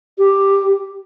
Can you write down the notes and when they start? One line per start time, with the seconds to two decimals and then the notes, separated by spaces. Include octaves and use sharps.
0.18 G4